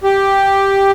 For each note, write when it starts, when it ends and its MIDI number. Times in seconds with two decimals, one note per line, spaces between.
0.04 0.92 67